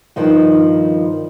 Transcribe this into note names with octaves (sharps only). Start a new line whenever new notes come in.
G2 D#3 F3